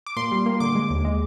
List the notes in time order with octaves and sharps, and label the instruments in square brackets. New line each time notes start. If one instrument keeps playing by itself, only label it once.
[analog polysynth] D6
A#2 C6
G3
A#3
D3 D6
G#3
D#2
G#3